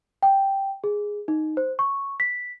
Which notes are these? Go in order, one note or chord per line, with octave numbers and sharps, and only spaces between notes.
G5
G#4
D#4
C5
C#6
B6